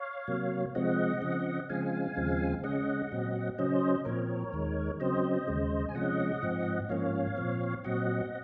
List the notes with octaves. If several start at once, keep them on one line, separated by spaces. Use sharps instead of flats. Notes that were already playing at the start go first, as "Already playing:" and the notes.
Already playing: C#5 F5
C3 F#3 A#3
C3 F3 G#3 C4 D#5 F#5
C#3 F3 C4
C#3 F3 G#3 C4 F5 G#5
D#2 C#3 F3 G#3 C4
C#3 G#3 C#4 D#5 F#5
A#2 F#3 C4
C#3 F#3 C#4 C5 D#5
A#2 F3 C4 A#4 C#5
D#2 D#3 G#3
C#3 F#3 C4 C5 D#5
D#2 C#3 G#3
G#5
C3 F3 G#3 C#4 D#5 F#5
G#2 F3 C4
G#2 F3 A#3 C#4 C#5 F5
A#2 F3 C4
A#2 F#3 C4 D#5 F#5